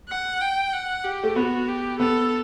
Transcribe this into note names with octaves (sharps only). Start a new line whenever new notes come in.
F#5
G5
F#5
G4
A3
B3 F#4
G4
B3 A4